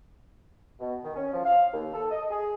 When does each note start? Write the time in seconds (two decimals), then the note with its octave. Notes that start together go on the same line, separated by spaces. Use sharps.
0.80 B2
1.04 D#3
1.16 C#4
1.33 F3
1.45 F5
1.73 D#2
1.94 A4
2.11 D#5
2.30 G#4